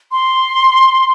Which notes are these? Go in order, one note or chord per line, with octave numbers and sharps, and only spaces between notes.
C6